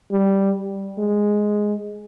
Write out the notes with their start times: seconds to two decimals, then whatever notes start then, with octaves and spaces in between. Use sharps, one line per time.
0.12 G3
0.98 G#3